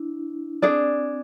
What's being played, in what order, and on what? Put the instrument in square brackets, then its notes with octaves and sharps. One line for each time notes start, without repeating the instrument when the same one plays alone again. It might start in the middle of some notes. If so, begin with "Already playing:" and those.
Already playing: [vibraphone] D4 E4
[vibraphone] C4 [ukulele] D4 G#4 D5